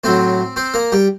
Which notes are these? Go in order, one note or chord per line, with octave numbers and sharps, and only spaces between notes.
A2 F#3 C4 C5
C4 C5
A#3 A#4
G3 G4